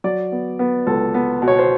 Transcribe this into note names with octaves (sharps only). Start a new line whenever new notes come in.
F#3 D5
B3
B3
C#2 A4
B3
B2
C#5
C5